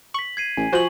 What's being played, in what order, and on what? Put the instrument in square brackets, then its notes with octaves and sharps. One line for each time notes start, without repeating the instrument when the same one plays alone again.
[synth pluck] C#6 [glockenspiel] B6 F#7
[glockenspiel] G#6 C7 D#7
[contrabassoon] A1 [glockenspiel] G#5
[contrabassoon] F3 [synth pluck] F#4 C5 [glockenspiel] G#5 C#6 F#7